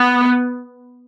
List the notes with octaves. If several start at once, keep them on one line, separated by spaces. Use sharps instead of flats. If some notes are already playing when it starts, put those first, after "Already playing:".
Already playing: B3